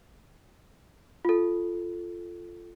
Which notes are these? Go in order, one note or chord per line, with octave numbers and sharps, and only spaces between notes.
F4 A4